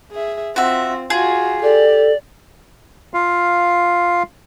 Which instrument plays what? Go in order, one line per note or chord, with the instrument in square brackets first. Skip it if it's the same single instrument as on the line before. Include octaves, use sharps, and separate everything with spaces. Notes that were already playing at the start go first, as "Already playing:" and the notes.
[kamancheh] G#4 E5
[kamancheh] C4 F4 [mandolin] F#4 E5
[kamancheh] F4 F#4 [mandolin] G#4
[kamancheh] G4 [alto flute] A4 [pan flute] D5
[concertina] F4 F5